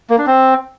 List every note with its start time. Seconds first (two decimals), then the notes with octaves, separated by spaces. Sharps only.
0.10 A#3
0.18 D4
0.27 C4